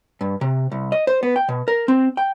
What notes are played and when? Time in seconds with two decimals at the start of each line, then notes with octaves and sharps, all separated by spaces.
0.21 G2
0.41 C3
0.72 C2
0.92 D#5
1.07 C5
1.23 B3
1.36 G5
1.49 B2
1.68 A#4
1.88 C4
2.17 G5